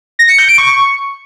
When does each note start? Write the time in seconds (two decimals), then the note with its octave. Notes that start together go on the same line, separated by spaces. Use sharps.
0.19 A#6
0.29 C#7
0.39 G6
0.48 D7
0.58 C#6